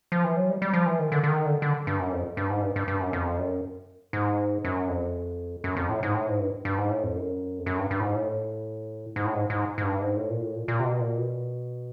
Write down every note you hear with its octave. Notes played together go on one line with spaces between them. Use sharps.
F3
E3
F#3
G3
G3
F3
E3
D#3
D3
D3
D#3
D3
D3
G2
F#2
F2
G2
G#2
G2
G2
G2
F#2
F2
F#2
G#2
F#2
F2
F#2
F2
A2
G#2
A2
G#2
G2
G2
G#2
A2
F2
F#2
F2
F#2
G2
G2
A2
G#2
A2
G#2
A2
G#2
G#2
G#2
G2
G#2
A2
A#2
A2
A#2
A#2
C3
B2
A#2
B2